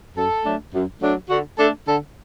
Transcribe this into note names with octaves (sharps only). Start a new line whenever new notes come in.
F#2 A4
F#3 A3 D4
F#2
F#3 A3 D4
D3 F#4
A3 D4 A4
D3 A4